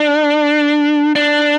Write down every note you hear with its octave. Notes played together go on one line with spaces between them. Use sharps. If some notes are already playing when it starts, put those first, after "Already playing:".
Already playing: D4
D4